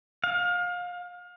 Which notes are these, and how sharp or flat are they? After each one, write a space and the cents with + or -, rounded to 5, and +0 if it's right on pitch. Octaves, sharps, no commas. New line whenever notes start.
F5 +30